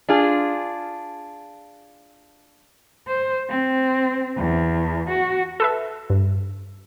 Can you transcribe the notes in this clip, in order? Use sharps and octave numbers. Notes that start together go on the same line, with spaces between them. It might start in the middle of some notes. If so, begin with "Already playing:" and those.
D4 F4 G#4
C5
C4
E2
F#4
A4 B4 E5
G2